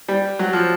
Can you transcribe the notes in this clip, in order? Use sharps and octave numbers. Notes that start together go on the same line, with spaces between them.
G3
F#3
F3